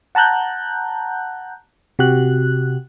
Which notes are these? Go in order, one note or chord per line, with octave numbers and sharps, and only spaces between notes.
F#5 A5 A#5 F#6 G6
C3 F#4 G4 F#6